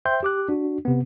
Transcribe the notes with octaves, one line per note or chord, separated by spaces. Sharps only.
C5 E5 G5 C6 G6
G4 D6 F#6
D4 F#4
C3 B3